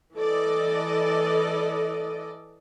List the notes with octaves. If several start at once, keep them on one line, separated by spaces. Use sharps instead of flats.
E3 A4 D5 D#5